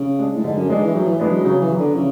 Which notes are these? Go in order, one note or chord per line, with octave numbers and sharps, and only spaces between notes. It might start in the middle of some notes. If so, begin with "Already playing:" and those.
Already playing: C#3
G#3 D4
A2
G#2 D3
F#2
G#2 G#3 D4
E3
A2 F#3
E3
E3 G#3 B3 D4
F#3
C#3 F#3
E3
F#3 B3
D3
C#3 E3